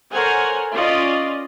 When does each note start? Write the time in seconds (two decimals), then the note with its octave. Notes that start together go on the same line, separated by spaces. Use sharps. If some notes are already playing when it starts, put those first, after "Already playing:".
0.13 A4 A#4 C5 C#5 F#5 G#5
0.73 C#4 F4 D5 D#5